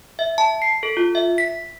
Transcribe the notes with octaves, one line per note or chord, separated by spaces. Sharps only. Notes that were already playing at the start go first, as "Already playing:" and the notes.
E5
A5
C7
A4
F4
E5
B6